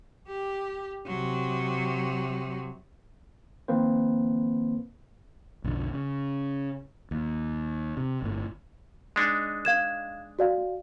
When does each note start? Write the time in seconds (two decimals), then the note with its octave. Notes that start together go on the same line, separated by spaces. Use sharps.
0.29 G4
1.07 C3 F#3
3.68 D#3 F3 A#3 C4 B4 C5
5.64 B1 F2 D3
5.93 C#3
7.11 D#2
7.97 C3
8.22 G1 A2
9.16 G#3 D4 D#4
9.65 F5 G#6 E7
10.39 F#4 D5 F5